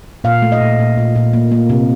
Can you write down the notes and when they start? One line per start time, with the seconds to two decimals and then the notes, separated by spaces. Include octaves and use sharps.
0.24 A#2 F5
0.42 A3
0.52 D#5
0.61 A#2
0.79 A#2
0.98 A#2
1.15 A#2
1.33 A#3
1.52 A#3
1.70 C3